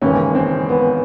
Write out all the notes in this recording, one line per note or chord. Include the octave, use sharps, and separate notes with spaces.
E1 D#2 C#3 E3 C#4
C4
B3